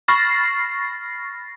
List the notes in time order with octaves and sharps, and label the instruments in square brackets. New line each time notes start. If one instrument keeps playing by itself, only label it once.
[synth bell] B5 C#6 F6 A6 A#6 C7